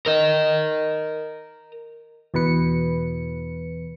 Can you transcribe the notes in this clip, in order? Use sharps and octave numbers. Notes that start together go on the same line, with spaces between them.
A#4 D#5
E2 B2 E3 B4 C#7